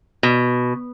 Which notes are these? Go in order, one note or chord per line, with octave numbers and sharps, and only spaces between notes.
B2